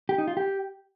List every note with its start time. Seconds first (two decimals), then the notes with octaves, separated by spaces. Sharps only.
0.09 G4
0.18 D#4
0.28 F4
0.37 G4